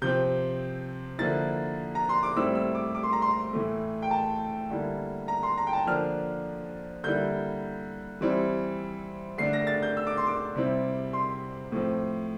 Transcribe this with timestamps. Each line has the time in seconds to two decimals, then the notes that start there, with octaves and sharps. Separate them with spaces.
0.02 C3 F3 C4 G6
1.19 D3 F3 A#3 E4 A6
1.95 A#5
2.09 C6
2.23 D6
2.36 A2 G3 C4 E4 E6
2.55 E6
2.75 D6
2.95 D6
3.03 C6
3.13 A#5
3.22 C6
3.53 A2 E3 A3
4.02 G5
4.11 A5
4.70 D3 G3 A#3 E4
5.28 A#5
5.43 C6
5.58 A#5
5.67 G5
5.73 A5
5.87 D3 F3 A#3 D4 F6
7.04 D3 G3 A#3 E4 G6
8.21 E3 G3 C4 E4
9.38 D3 A3 D4 C7
9.53 A#6
9.67 A6
9.83 G6
9.97 E6
10.07 D6
10.17 C6
10.27 D6
10.56 C3 G3 C4 E4
11.13 C6
11.72 A2 F3 C4